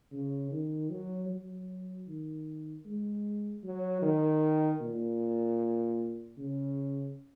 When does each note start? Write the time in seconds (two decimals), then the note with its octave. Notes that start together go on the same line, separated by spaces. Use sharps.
0.12 C#3
0.51 D#3
0.90 F#3
1.29 F#3
2.07 D#3
2.85 G#3
3.64 F#3
4.02 D#3
4.81 A#2
6.38 C#3